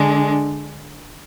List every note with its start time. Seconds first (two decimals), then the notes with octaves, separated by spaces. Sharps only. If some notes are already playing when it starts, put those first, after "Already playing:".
Already playing: D3 G#3 D4